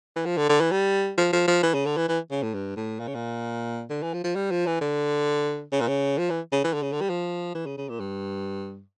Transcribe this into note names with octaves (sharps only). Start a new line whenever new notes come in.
E3
F3
D3
D3
E3
G3
F3
F3
F3
E3
C#3
D3
E3
E3
C#3
A2
G2
A2
A#2
C#3
A#2
D3
E3
F3
F3
G3
F3
E3
D3
C#3
A#2
C#3
F3
E3
C#3
E3
D3
C#3
D3
G3
F3
E3
C#3
C#3
A#2
G2